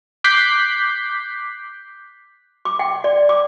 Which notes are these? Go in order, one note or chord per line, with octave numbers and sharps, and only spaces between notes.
D6 F#6 G6 B6 C7
D6
G5
D5
D6